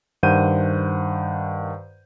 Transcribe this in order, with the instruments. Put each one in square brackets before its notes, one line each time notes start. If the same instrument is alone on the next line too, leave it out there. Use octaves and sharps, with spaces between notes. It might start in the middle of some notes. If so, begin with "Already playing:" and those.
[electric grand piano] G2 D#3 C5 F#5 G6 D#7